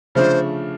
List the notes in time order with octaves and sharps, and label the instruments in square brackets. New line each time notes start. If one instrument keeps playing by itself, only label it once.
[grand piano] C#3 F3 A3 D4 [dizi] C5